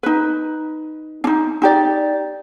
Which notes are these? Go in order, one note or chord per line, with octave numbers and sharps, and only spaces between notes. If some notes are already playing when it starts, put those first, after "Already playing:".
D#4 B4
D4 D#4
D#4 G4 D5